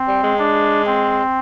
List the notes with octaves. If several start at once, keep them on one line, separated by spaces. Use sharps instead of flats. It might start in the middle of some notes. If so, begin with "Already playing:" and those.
Already playing: C4
G3
G#3
D4
C4